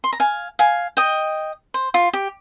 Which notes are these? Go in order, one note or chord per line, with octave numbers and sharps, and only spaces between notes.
C6
A#5
F5 G#5
F5 G#5
D#5 G5
C5
F4
G4